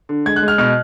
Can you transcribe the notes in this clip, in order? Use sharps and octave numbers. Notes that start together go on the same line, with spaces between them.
D3
G#3 G#6
F#6
G#3
F6
B2 F6